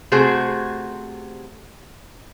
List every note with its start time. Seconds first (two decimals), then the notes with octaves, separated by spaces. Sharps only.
0.12 C3 A3 F#4 G#4 C5